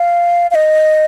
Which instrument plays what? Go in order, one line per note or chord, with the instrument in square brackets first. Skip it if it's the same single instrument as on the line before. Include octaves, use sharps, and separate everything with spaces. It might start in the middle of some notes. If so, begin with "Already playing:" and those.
Already playing: [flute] F5
F5
D#5